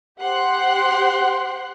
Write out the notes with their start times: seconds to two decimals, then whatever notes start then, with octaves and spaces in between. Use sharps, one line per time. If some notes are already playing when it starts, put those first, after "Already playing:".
0.20 G4 C5 F#5 G5 C6 F#6